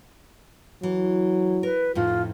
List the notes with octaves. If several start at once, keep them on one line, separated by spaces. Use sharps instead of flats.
E3 F#3
A#4 B4
F2 A2 D#4 F4